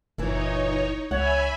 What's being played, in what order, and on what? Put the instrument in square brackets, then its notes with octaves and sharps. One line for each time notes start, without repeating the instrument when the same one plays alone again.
[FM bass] F#1 [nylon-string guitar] A#2 E3 [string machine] D#4 C#5
[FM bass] C#2 [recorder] C#5 [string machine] E5 G#5 B5 [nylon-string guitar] F#5